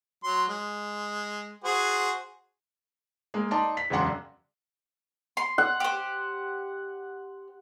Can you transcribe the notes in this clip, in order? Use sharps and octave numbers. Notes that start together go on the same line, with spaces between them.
F#3 C6
G#3
F#4 G#4 C5
G#3 A#3
D#4 D5 A5 C6
B6
E1 F#2 C#3 D4 F#5 C6
C6
F#5
G4 C5